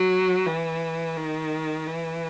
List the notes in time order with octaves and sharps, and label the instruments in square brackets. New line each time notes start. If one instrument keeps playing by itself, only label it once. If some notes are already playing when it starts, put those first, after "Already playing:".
Already playing: [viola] F#3
E3
D#3
E3